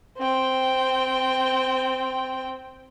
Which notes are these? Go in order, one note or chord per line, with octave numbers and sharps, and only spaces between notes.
C4 G5